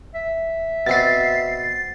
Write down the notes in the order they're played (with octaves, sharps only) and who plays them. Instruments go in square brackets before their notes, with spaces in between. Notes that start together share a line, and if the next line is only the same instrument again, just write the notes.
[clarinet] E5
[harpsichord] B2 C4 F#4 [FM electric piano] A6 C7